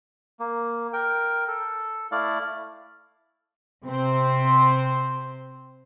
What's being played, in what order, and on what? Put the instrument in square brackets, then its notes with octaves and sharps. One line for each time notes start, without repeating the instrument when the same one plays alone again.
[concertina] A#3
A#4 G5
A4
A3 E4 D5 F5
[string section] C3 C4 C5